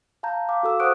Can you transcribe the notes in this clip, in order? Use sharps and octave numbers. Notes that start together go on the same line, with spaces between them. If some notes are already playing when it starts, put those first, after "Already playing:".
F5 A5 A#5 G6
F5 D6
F#4 A4 E6
C5 F#5 C#6 D#6 F#6 D7